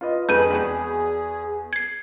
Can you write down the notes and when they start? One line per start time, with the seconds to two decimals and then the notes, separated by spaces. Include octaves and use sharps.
0.01 F4 B4 D#5
0.29 F2 G#3 G#4 A4 B4 G6 D#7
0.50 E2 F#4 G5 B5
1.73 G#6 C7